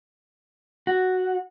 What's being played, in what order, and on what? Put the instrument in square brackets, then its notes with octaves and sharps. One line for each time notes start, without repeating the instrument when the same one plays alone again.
[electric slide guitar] F#4